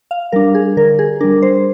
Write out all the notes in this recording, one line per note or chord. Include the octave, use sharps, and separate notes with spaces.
F5
G3 D4 A#4
G#4
D3 A#4
G#4
G3 D4 A#4
C5